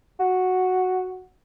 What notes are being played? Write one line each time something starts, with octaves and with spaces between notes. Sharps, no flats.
F#4